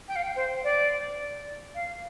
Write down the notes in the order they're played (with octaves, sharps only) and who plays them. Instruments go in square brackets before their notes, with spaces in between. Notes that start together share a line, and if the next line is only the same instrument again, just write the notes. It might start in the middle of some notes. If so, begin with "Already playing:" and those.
[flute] G5
F5
G5
C5
D5
F5